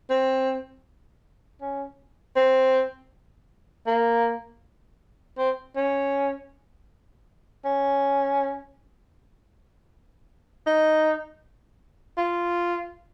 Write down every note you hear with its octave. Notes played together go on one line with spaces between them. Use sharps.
C4
C#4
C4
A#3
C4
C#4
C#4
D#4
F4